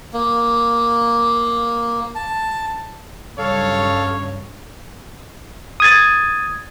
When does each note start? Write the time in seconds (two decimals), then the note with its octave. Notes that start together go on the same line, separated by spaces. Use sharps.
0.13 A#3
2.15 A5
3.38 G2 C#3 F#3 A4 C#5 F5
5.80 D#6 G#6 A6